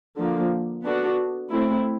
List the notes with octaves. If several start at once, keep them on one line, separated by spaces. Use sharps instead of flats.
D3 F3 A#3
B3 D4 F#4 A4
A3 C4 E4